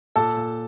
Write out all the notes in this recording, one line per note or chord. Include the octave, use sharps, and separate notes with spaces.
A#2 A4 A5
A#2